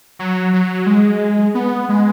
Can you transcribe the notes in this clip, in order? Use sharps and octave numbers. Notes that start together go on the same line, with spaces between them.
F#3
F#3
G#3
B3
G#3